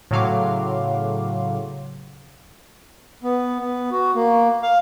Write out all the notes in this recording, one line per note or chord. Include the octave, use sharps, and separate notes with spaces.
A2 C#3 F#3 F5 C6 D6
B3
B3
F#4
A#3
F5